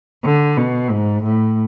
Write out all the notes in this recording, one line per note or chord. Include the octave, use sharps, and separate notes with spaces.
D3
B2
G#2
A2